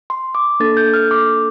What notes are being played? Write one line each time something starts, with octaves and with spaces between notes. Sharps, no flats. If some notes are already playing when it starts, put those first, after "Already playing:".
C6
D6
A#3 D4 A4 A6
G6
F6
D6